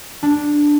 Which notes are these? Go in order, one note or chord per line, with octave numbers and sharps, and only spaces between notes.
D4